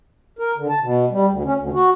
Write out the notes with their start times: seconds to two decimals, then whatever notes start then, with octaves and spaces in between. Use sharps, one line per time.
0.39 A#4
0.58 D3
0.69 A5
0.81 B2
1.10 G3
1.29 D2
1.45 C#4
1.58 D2
1.74 F#4